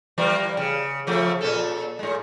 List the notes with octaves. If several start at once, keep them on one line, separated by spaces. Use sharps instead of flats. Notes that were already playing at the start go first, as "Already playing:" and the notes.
E3 G3 A#3
C#3
C#3 F3 A3
A#2 C#4 A4
A2 G#3